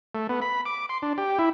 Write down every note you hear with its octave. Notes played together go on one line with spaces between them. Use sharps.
A3
B3
B5
D6
C6
D4
G4
E4